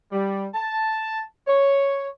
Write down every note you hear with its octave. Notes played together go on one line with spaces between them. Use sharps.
G3
A5
C#5